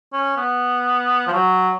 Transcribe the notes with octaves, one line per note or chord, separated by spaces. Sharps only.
C#4
B3
F3
F#3